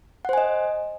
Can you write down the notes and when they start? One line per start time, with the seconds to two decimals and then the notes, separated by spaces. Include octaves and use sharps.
0.25 F#5
0.29 C5
0.33 G#5
0.38 D#5